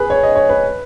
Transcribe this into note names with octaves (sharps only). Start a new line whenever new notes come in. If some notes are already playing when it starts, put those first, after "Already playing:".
Already playing: G#4 B4
C#5
D#5
C#5
B4